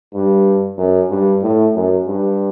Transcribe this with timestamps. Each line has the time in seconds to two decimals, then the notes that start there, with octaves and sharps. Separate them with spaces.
0.14 G2
0.78 F#2
1.10 G2
1.43 A2
1.75 F#2
2.07 G2